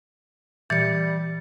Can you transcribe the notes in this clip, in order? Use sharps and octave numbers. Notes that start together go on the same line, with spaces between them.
A#2 E3 G3 A6 C#7